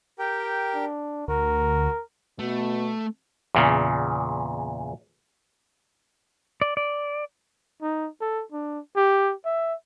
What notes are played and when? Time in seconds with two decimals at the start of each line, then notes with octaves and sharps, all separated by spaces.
0.19 G4 A#4 G5
0.74 D4
1.28 D2 F#4 A#4
2.39 B2 A3 B3
3.55 E2 A#2 C#3
6.62 D5
6.77 D5
7.82 D#4
8.21 A4
8.52 D4
8.96 G4
9.45 E5